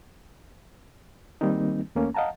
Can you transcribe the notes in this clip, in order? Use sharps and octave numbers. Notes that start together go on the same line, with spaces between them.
D#3 G3 A#3 C4 D#4
D#2 A3 A#3 C#4
D#5 F5 F#5 A5 A#5